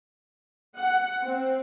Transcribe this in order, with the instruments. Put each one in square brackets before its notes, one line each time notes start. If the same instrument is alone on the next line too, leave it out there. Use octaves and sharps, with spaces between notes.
[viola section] F#5
C4